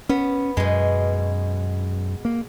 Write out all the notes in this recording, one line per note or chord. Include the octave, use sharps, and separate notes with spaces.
B3 C#4
F#2 B2 G#3
A#3